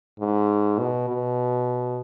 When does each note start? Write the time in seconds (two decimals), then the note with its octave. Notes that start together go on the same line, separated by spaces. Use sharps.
0.20 G#2
0.79 B2
1.09 B2